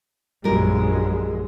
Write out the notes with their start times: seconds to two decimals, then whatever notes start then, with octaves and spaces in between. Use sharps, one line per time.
0.44 A#1 F#2 G3 G#3 A#4